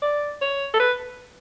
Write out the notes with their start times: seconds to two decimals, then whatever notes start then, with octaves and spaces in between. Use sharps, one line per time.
0.02 D5
0.41 C#5
0.74 A4
0.80 B4